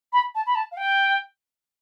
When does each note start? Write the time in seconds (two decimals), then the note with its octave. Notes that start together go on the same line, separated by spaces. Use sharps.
0.13 B5
0.35 A5
0.47 B5
0.55 A5
0.72 F5
0.77 G5